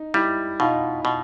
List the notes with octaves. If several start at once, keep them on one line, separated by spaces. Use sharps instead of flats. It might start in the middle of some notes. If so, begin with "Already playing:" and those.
Already playing: D#4
G3 E4
B2 D#4 F4
B2